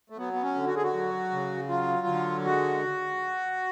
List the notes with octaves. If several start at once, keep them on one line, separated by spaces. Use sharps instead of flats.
A3
F#3 B3
B3
C#4
D3
F#4
G#4
F#4
F#3
C#3
F#3 F4
D3
G#3 F#4